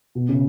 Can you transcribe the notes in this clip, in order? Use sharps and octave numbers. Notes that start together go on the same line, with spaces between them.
B2
C#3